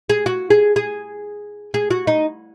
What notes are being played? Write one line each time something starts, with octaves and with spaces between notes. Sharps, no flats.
G#4
F#4
G#4
G#4
G#4
F#4
D#4